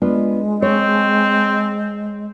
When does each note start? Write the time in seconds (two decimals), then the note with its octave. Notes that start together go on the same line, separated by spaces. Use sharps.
0.02 G#3 B3 D4 F4
0.62 C4 C#5